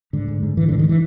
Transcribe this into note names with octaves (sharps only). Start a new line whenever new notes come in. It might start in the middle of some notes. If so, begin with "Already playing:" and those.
G#2 D3
G#2
G#2
G#2 E3
G#2 D3
D#3
E3